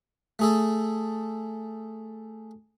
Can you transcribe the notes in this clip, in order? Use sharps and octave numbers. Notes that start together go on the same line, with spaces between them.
A3 G#4 A4